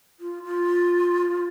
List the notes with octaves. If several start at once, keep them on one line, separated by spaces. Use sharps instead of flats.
F4
F4